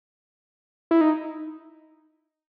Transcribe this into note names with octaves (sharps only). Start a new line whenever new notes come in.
E4
D#4